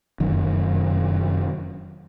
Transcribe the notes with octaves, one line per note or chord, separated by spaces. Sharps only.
F1 F#2 D#3